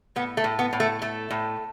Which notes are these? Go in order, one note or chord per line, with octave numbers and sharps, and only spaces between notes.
A2 B3
A3
A2
B3
A2
A3
A3
A2